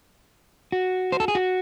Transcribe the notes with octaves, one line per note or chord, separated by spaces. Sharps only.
F#4
C5
A4
G#4
F#4